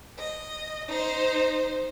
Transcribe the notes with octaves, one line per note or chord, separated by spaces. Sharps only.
D#5
D#4 C5